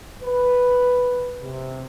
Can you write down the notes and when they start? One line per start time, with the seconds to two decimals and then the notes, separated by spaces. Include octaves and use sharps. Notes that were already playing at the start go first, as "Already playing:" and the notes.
0.24 B4
1.42 C3